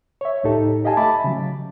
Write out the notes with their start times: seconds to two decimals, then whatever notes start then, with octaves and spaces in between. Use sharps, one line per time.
0.21 C#5 E5
0.43 C#2 A2 D#4 G4 A4
0.84 G4 D#5 F5 G#5 A5
0.97 A3 E5 A5 B5 D6 A6
1.24 C#3 F#3